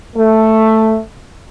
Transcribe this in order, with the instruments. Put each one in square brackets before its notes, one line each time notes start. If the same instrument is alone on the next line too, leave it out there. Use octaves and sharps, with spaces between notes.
[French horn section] A3